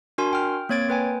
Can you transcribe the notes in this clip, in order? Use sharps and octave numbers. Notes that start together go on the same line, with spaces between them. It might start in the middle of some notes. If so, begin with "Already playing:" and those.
D4 F#4 A#4 G#5 C6
G5 F6
A#3 C4 C#5 G#6 A6 D7
A#3 B4 G5 G#5